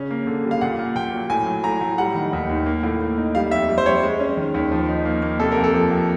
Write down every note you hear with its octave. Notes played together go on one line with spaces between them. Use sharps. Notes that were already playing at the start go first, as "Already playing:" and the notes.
Already playing: C#3 C#4
A#3
D3
G3
F5
A#2 F#5
A#3
A#2 G5
F#3
A2 G#5
F#3
A2 A#5
A2
G3 F#5
D#3
D#2
D#2
A#3
A2
A#3
D#4
G3 F5
F2 E5
G3
C5
G3 C#5
G#3
C#4
D#3
D#2
F3
D#4
A#3
A#3
C3 A4
A#4
F2
A4
F3
F2